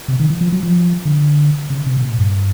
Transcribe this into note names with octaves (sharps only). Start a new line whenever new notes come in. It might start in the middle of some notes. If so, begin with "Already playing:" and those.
C3
D#3
E3
F3
F#3
F3
D3
C#3
C3
B2
A#2
G2